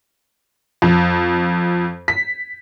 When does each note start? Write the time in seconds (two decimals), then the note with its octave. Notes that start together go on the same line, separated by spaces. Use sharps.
0.82 F2
2.08 B6